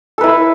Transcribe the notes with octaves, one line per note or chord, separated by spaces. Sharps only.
E4 A4 B4